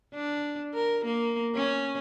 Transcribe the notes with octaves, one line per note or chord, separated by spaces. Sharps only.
D4
A#4
A#3
C#4